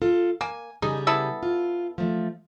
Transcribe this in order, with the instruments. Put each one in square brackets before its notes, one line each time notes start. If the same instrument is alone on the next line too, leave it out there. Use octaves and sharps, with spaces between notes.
[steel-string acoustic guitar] F4 A4
[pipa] A#3 [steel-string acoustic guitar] G#5
[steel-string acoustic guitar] C#3 G3 G#4 [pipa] D#4
[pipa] B3 E4 A4
[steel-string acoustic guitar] F4
F3 A3